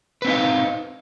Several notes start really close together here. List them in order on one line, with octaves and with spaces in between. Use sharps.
B4 C4 D#4 F5